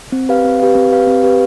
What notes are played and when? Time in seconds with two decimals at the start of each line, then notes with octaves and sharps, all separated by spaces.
0.12 C4
0.29 G4 B4 F5
0.44 C4
0.60 G4 B4 F5
0.75 C4
0.92 G4 B4 F5
1.07 C4
1.23 G4 B4 F5